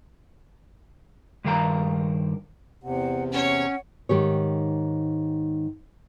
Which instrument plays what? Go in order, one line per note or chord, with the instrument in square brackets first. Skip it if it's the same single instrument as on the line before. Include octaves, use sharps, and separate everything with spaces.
[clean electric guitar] G2 D#3 A#4 F5 A#5
[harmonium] E2 C3 [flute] F#5
[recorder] C#4 [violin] C#5 [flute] F#5
[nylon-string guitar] G#2 D#3 G4 C#5